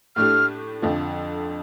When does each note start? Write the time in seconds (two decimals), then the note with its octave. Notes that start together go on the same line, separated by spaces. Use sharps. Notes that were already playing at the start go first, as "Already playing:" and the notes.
0.16 A2 A3 D4 G4 F6
0.82 F2 D3 F3